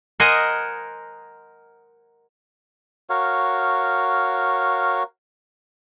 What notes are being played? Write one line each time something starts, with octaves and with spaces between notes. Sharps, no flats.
A#4 C5 D#5 F#5 G#5
F#4 A#4 C#5 F5